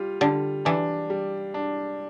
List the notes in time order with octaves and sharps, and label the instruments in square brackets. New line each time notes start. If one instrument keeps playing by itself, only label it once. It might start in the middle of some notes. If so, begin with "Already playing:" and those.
Already playing: [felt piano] G3 F4
[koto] D3 [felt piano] G3
[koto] E3 [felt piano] D4
[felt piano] G3
D4